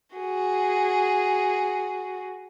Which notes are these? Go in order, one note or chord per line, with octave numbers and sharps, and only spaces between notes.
F#4 G#4